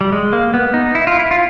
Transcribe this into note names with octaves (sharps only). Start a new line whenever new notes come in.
G3
G#3
A#3
B3
D#4
E4
F4
E4
F4